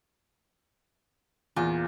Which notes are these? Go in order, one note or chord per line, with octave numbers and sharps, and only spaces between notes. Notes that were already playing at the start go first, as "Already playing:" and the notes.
E2 A#2 F4